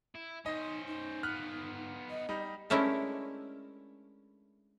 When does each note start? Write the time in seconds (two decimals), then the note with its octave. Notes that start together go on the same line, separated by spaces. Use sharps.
0.15 E4
0.46 C#4 D#4 C5 D#5
0.87 D#4
1.23 B3 F4 F6 F#6
2.10 D#5
2.29 G3 D#4
2.70 G#3 A3 C#4 D4 E4 A#4